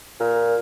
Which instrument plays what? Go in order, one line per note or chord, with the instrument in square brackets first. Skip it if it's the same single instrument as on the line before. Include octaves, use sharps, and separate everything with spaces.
[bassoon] A#2